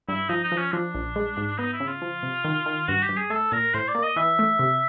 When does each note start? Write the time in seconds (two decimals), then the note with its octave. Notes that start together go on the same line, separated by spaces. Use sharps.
0.08 G2 E4
0.29 F3 D#4
0.44 D#4
0.52 F3
0.58 C#4
0.72 F3 D4
0.95 A#1
1.16 G#3
1.37 G#2
1.59 B3 D#4
1.73 E4
1.80 C#3
1.87 F4
2.02 F3
2.23 C3
2.44 D#3
2.66 D#3
2.88 G2 F#4
3.02 G4
3.09 G2
3.17 G#4
3.30 A3 A4
3.52 A#2 A#4
3.74 A2 C5
3.88 D5
3.95 A#3
4.03 D#5
4.16 E3 E5
4.39 A3
4.59 C3